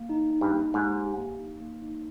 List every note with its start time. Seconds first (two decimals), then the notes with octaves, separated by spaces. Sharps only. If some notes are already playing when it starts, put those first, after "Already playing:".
Already playing: A#3
0.09 D#4
0.30 D#4
0.41 G2
0.53 A#3
0.74 G#2 G4
0.96 G4
1.17 A#3
1.39 D#4
1.60 A#3
1.82 D#4